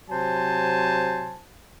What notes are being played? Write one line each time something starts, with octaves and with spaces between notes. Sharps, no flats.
C3 F#3 C5 G#5 A5